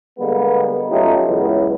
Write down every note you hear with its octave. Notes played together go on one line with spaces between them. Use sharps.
D3 G3 G#3 A#3 B3
F#3 A3 C#4 D#4 F4 G4
C#2 E3 F#3 B3